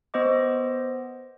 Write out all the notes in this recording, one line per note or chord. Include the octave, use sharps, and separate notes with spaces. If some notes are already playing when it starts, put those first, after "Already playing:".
B3 C5 D#5 D6